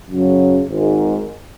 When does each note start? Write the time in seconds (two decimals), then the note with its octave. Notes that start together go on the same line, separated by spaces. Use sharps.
0.08 F#2 C#3 F#3
0.68 G#1 G#2 D#3